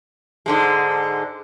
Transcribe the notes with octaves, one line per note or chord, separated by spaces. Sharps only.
G#2 D3 G#3